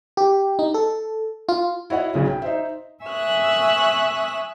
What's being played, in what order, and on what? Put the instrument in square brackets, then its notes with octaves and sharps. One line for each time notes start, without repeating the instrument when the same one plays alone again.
[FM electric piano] G4
D#4
A4
F4
[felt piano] E4 F#4 C#5 D#5 F#5
B1 C#3 C#4
G5
D#4 C5 E5
[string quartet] E5 G#5 C#6 D#6 E6 F#6